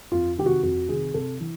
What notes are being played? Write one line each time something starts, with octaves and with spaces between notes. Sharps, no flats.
F2 F4
C3 D#3 F#4 G4
F2 F#4
C3 D#3 G#4
C3 A4
E3